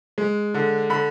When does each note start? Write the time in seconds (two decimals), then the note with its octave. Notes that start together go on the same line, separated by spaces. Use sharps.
0.18 G#3
0.54 D3
0.90 D3 B5